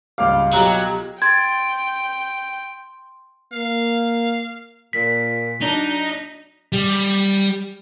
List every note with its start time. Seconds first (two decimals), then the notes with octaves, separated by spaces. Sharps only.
0.18 G#1 C#2 G3 F5 D6 F6
0.53 B1 F#3 F4 G4 A#5 F#7
1.22 G5 C6 G#6 A6
3.53 A#3 F5
4.93 A#2 B6
5.61 F#3 D4 D#4
6.72 G3